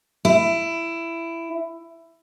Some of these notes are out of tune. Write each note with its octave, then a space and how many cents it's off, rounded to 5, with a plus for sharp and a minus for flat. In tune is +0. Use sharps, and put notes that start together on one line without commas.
E4 +15